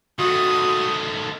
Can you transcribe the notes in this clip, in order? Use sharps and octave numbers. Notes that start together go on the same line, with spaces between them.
D#3 A3 F#4 D#6